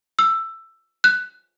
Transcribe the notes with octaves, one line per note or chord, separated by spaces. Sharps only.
E6
F#6